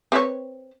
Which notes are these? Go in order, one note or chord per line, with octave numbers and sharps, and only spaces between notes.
C4 B4 C#5